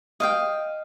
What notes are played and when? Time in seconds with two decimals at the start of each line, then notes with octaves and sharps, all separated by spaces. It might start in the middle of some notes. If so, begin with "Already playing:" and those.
0.20 D#5 F5 G5